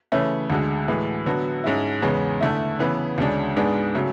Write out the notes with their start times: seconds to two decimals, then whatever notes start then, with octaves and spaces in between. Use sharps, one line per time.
0.12 C#3 E3 A3 C#4
0.50 D2 D3 G#3
0.88 A2 E3 G#3
1.26 D3 F#3 B3 F#4
1.64 G#2 G#3 C#4 E4
2.02 E2 C#3 G#3 B3
2.41 D3 A3 E4
2.79 C#3 E3 B3
3.18 D2 C#3 G#3 D4
3.56 G#2 G#3 B3 D4 G#4
3.95 C#3 F#3 A3